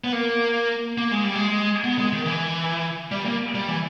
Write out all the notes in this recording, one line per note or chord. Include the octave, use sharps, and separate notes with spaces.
B3
A#3
A#3
G#3
G3
G#3
B3
G#3
D#3
E3
G3
A#3
G3
E3